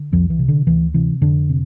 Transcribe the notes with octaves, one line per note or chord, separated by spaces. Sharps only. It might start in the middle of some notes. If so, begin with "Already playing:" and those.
Already playing: D3
C2 F2 F3
E3
C3
D3
D2 E3
C3 E3
F2 D3 D4
C3